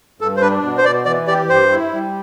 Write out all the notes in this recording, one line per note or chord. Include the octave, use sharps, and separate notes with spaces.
G2 A4
C5
D4 B4
B2
C5
B2 D5
E3 D5
G4 D5
G2 C5
E4
G3